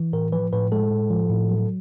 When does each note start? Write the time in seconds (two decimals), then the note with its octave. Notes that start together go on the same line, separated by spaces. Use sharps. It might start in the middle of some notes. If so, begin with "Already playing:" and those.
Already playing: E3
0.13 A2 A#4
0.32 F3 B4
0.53 A2 B4
0.72 G#3 A4
0.91 A2
1.11 F3
1.30 A2
1.49 F#3